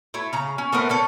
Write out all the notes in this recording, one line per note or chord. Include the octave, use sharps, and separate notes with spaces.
A3 E4
C#3 A#5
C#4
A3 B3 C4 A#4
D3 C#4 A4